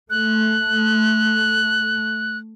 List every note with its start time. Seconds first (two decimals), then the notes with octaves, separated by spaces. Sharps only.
0.10 A3 F#6